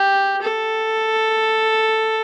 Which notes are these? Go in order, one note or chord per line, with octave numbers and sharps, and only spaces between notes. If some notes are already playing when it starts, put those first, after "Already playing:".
Already playing: G4
A4